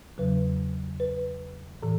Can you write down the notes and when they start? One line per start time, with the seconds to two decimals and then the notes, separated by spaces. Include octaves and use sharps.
0.18 E2 C#3 F#3 B4
1.00 B4
1.82 A2 E3 A4